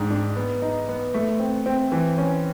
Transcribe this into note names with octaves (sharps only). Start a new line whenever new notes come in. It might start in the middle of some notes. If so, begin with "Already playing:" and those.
Already playing: G#2 D4
D4
B3
D#4
B3
A3
C4
C4
E3
C#4